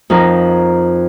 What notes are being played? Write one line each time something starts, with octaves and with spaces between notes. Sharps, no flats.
F2 D#4 A#4